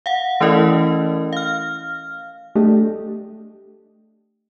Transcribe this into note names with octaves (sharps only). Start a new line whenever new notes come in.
F5 F#5
E3 A3 C#4 E4 A#4 D#5
F5 F6
A3 D4 G4 A4 D#5